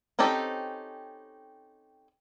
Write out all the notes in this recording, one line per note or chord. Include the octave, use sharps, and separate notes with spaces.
C4 C#4 D#4 G4 A4